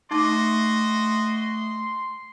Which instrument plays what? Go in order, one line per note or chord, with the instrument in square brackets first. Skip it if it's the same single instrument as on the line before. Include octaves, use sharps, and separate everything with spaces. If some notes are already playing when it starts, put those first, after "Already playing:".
[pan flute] A3 [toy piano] D#4 A5 D6 [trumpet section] F#4 D#5 [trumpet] C6